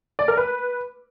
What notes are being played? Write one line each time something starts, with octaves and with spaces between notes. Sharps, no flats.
D5
A#4
B4